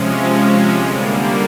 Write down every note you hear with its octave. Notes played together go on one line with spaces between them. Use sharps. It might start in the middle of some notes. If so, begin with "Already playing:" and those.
Already playing: C3 F3 G#3 C#4
D3 G3 A#3